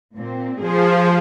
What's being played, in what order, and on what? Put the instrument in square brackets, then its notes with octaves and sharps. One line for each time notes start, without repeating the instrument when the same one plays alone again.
[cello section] A#2 C4
[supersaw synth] F3 [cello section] G#4 C5